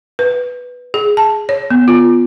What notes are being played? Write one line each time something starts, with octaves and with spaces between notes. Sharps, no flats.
B4
G#4
A5
C#5
B3
F4